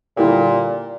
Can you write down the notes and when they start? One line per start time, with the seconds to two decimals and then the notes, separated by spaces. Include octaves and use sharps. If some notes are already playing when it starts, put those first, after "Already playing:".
0.17 A#2 D3 G3 A#3 E4 G4